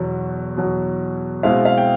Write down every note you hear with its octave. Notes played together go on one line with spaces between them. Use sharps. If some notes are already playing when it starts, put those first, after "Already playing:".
Already playing: E2 B2 F#3
E2 B2 F#3
B2 G#3 C4 E4 F5
F5
G5